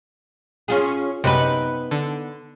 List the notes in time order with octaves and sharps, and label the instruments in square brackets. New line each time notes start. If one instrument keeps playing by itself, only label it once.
[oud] C#4 F4 G#4
[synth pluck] F#2 C3 [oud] B3 D#4 B4
[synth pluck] D3